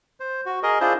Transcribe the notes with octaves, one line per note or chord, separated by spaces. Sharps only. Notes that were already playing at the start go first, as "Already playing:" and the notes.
C5
F#4
G#4 A#4 D#5
D4 E4 F4 G#4 C5